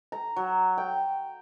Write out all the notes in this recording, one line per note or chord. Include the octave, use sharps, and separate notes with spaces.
A#5
F#3
G5